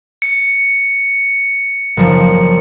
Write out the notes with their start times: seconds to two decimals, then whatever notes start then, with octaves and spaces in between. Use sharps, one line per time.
0.22 C#7
1.97 F#1 F3